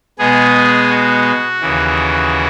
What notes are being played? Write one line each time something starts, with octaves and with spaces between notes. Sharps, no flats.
B2 G#3 B3 G#4
F#4
D#2 C#3 E3